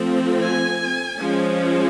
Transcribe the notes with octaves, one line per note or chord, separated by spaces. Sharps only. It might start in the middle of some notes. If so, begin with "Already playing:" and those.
Already playing: F3 A3 C4
G#5
F3 G#3 C#4